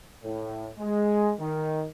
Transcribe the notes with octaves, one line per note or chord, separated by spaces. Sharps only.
A2
G#3
D#3